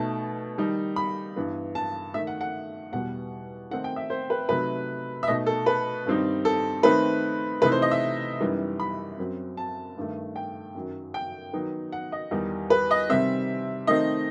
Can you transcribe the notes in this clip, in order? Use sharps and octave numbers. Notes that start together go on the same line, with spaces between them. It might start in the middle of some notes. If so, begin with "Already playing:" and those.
Already playing: B2 A3 D#4 A5
D#3 G3 D#4
B5
G2 E3 B3
A5
D#3 A3 D#4 E5
F#5
F#5
E2 B2 G3 B3 F#5
D#3 A3 C4 D#4 F#5
G5
E5
C5
B4
C3 F#3 A3 D#4 B4
E5
B2 A3 D#4 D#5
A4
B4
G2 D#3 G3 C4 D#4
A4
D#3 A3 C4 D#4 B4
C3 E3 A3 D#4 B4
C5
D#5
E5
F#2 E3 G3 B3 D#4
B5
F#2 F#3 C4
A5
G2 D#3 A3
G5
F#2 D#3 F#3
G5
D#3 F#3 B3 D#4
F#5
D#5
E2 D#3 G3 D#4
B4
D#5
C3 D#3 G3 C4 E5
D#3 A3 C4 D#4 D#5